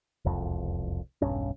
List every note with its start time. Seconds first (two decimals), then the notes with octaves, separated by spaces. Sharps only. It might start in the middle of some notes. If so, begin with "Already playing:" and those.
0.25 E1 C2 F2
1.22 E1 B1 G2 C#4